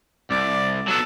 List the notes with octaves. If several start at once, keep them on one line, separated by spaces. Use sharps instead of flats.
C2 D5
F#3 B3 A4